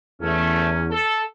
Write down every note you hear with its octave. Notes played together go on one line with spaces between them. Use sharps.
E2 A3 C#4
A4